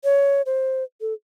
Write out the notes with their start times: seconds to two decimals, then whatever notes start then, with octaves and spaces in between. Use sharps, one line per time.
0.04 C#5
0.46 C5
1.01 A4